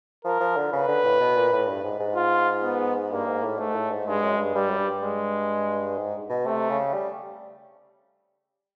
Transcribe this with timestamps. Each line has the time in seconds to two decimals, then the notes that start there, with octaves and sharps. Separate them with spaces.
0.24 F3 A#4
0.40 F3
0.57 D3
0.72 C#3 B4
0.88 D3
1.04 A2
1.20 B2
1.36 A#2
1.52 A2
1.68 G2
1.84 G#2
1.99 G#2
2.16 F4
2.63 B3
3.11 G2 A#3
3.27 G#2
3.43 A2
3.59 G#2 A3
3.75 A2
3.91 G#2
4.07 G2 G#3
4.22 F#2
4.38 G2
4.55 G2 G3
4.70 F#2
4.79 G2
5.02 G#3
5.98 G#2
6.29 B2
6.46 C3 A3
6.70 C#3
6.93 G3